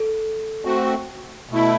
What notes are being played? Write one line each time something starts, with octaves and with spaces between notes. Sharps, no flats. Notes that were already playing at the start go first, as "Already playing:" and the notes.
Already playing: A4
A3 C4 F#4
B2 A3 E4